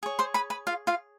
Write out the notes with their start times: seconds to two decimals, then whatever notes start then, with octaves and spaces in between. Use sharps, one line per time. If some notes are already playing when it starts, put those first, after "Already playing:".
0.03 G#4 C#5
0.19 C5 C6
0.34 B4 B5
0.50 B4 B5
0.67 F4 F5
0.87 F4 F5